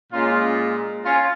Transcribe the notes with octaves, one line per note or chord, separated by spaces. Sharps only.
A#2 G#3 C#4 F4
C#4 F4